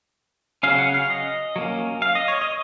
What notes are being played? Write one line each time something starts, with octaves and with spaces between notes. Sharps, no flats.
C#3 F#3 C#4 F5
F#5
F5
D#5
F#3 A#3 C#4
F5
D#5
C#5
D#5